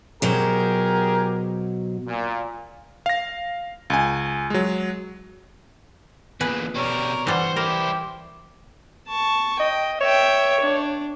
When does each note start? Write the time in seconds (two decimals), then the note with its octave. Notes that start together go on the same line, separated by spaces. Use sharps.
0.22 B2 F#3 G4 G#4 A#4 C5
2.07 A#2
3.06 F5 A#6
3.90 C#2 G#5
4.50 F#3 G#3
6.41 E2 A#2 G#4 B4
6.75 B2 G3 A#4 C#5 D5
7.27 G2 E3 G3 C5 F#5
7.56 G3 E4 G4 A#4
9.09 A5 C#6
9.60 D#5 G5
10.01 C#5 E5 G5
10.60 D4